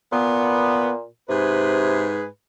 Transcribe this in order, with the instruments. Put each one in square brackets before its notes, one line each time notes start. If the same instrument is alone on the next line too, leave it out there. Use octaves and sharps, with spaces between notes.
[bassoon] A#2 [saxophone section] B3
[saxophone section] G#2 G#4 B4 [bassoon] C3